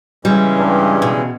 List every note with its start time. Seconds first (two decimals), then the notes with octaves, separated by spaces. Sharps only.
0.25 C#3 E3 G3 G#3
0.58 G2
1.02 B2